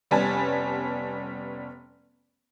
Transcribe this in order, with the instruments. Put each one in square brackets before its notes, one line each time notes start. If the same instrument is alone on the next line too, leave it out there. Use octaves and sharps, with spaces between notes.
[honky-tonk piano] F1 G3 B3 C#4 G#5 A5